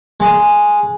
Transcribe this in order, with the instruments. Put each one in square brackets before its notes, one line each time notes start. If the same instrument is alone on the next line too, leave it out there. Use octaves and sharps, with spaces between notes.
[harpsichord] G#3